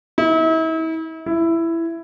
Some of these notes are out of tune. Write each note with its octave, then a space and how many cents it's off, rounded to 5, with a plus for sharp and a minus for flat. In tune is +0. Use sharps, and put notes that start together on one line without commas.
E4 -40
E4 +10